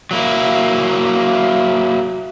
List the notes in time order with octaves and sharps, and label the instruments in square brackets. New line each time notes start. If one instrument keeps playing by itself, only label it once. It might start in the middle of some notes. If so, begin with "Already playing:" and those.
[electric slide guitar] F#3 A#3 E4